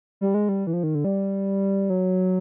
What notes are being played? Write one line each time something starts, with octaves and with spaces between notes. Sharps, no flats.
G3
G#3
G3
E3
F3
D#3
D3
G3
F#3